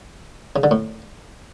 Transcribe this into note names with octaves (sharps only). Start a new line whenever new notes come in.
C#3
D3
A2